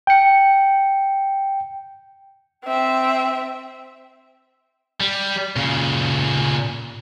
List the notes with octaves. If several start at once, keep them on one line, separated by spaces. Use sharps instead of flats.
G5 C#7
C4 E5
G3
A#2 C#3